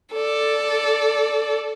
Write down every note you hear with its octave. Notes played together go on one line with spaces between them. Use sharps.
A4 D5